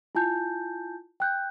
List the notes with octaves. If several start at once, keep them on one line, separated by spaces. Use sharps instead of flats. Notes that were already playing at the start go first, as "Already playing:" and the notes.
E4 F4 G#5 A5 G6
G5 F#6 G6